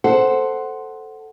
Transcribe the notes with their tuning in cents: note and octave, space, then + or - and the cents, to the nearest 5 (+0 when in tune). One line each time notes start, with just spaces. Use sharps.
A4 +0 C5 +0 F#5 +5